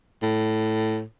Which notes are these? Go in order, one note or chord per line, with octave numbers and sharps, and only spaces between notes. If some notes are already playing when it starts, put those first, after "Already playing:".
A2